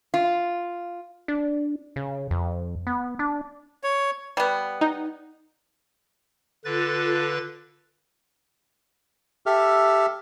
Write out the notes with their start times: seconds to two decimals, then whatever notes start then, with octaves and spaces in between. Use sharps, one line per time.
0.14 F4
1.28 D4
1.96 C#3
2.31 F2
2.87 B3
3.19 D4
3.83 C#5
4.37 G3 B3
4.81 D#4
6.65 D3 F4 A4 B4 A6
9.46 G4 A4 E5 F6